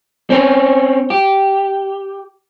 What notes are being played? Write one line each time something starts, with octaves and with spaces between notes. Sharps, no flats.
C4 C#4
G4